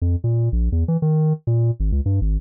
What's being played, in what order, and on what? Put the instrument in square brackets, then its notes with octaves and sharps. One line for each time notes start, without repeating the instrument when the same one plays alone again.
[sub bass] F2
A#2
A#1
E2
E3
D#3
A#2
G#1
C#2
G2
G#1